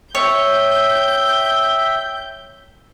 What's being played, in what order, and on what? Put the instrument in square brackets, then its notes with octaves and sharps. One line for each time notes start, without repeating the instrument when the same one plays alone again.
[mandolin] C#5 [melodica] E5 G5 [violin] G6